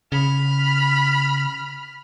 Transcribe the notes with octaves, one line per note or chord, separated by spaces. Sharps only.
C#3 B5 F6